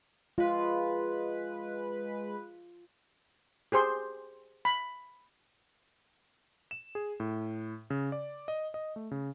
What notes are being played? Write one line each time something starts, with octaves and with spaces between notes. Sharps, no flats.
G#3 F4 B4
G4 G#4 C5 C6
B5
E7
G#4
A2
C#3
D5
D#5
D#5
A3
C#3